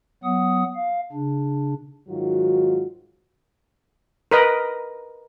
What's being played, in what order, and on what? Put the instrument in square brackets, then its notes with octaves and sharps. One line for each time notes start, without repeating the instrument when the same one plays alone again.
[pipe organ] F#3 B3 F#5 D#6
F5
C#3 D4
[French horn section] G#2 D#3 F#3 F4 F#4
[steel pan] A#4 B4 D#5